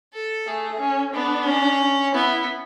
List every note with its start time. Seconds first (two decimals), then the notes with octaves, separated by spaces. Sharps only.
0.14 A4
0.47 A3 G#4
0.80 C#4
1.14 B3 D4
1.47 C#4
2.14 B3 E4